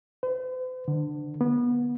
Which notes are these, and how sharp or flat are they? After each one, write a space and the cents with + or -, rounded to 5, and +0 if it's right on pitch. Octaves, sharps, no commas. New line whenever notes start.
C5 -45
D3 +20
B3 -25